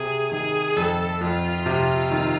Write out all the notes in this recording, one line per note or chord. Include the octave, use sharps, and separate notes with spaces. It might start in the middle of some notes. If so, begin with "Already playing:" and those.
Already playing: C3 G#4
D#3 G#4
F2 A4
F2 F4
C3
D#3